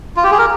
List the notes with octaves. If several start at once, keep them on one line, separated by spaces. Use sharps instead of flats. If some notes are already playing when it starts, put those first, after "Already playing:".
F4
G4
G#4
A#4